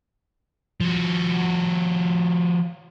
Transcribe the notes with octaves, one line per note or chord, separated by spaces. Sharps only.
F3 F#4